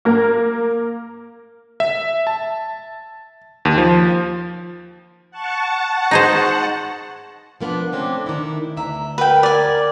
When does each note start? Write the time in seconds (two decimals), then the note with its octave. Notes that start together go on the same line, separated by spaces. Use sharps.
0.05 A#3 A#4
1.80 E5
2.27 A5
3.65 D#2
3.78 F3
5.31 F#5 A5 C#6
6.11 D#4 G#4 C5
7.61 F3 A#3 B3 D4
7.93 A3 C4 C#4
8.26 D#3 E4
8.77 D2 B3 E5 A#5
9.18 A#4 B4 G5
9.43 D5 G#5